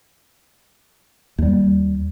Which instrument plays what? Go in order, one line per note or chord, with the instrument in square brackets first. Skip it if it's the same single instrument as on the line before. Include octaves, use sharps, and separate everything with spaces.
[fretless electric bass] D#2 G3